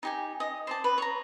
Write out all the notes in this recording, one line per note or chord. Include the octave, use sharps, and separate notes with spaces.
D#4 G4 G#5
D#5
C5 D5 A5
B4
C#5 A#5